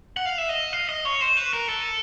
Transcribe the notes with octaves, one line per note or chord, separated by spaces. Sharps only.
F#5
F5
E5
D#5
F5
D#5
C#5
C5
B4
A#4
A4